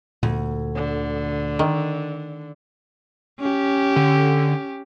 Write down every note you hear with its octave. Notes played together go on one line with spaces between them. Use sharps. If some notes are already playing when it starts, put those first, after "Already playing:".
D2 A#2
D3
D#3
C#4 G4
D3